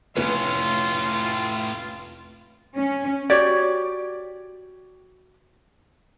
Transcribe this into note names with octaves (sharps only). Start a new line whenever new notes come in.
F1 A2 C#4 F4 B4
C#4
F#4 G4 C#5 D5